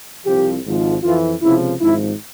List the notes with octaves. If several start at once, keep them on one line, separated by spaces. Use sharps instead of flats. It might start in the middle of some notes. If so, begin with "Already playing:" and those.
C2 C3 F3 G4
G#1 G#2 F3
F2 E3 F4
C#2 C3 F3 E4
G#1 G#2 F3 E4